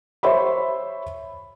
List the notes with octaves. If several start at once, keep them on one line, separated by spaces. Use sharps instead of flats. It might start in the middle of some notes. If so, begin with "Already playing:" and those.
C5 C#5 E5 B5